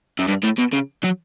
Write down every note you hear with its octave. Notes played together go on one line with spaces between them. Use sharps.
F#2
G2
A2
B2
C#3
F#3